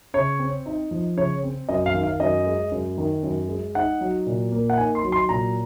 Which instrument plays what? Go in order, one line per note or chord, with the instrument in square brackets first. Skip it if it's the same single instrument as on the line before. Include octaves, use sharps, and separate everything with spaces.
[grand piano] C#3 C#5
C4
D#4
F3
C#3 C#5
C4
F#2 D#5
F5
D#3
F5
F#2 D#5
G#3
F#2
D#3
F#2
G#3
D#4 F#5
F#3
A#2
A#3
F#5
D#4 G#5
C6
F#3
C6
A#2 A#5